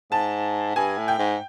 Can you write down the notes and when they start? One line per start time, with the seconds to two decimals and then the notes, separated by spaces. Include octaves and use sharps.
0.11 G#2 A5
0.76 G2 G#5
0.97 A2
1.08 G5
1.19 G#2